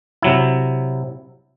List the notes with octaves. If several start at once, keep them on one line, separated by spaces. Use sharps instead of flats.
C3 F#3 E4